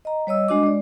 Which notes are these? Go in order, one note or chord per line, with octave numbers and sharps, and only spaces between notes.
D#5 A#5
G3 C#5 D#5 E6
G#3 D4 F#4 D#5 D6
G#3 D5